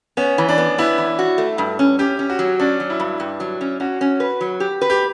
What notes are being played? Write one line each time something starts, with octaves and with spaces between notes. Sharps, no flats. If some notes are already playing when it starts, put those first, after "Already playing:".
B3 C#4
E3
D4
B3
B3 E4
E3
F#4
A3
G2
C#4
C#4 G4
C#4
F#4
F#3
C#4 D4
F#3
E4
G2
G2
F#3
C#4
C#4 F#4
C#4
B4
F#3
G4
B4
G4